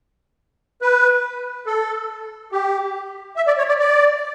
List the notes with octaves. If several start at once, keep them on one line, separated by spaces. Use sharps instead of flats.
B4
A4
G4
E5
D5
C#5
D5
D5